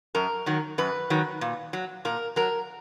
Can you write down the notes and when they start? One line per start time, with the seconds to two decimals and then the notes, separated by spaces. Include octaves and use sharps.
0.15 F#2 A#4
0.46 D#3 F#3
0.78 F#2 B4
1.10 D#3 F#3
1.41 A#2
1.73 F#3
2.05 A#2 A#4
2.36 F#3 A#4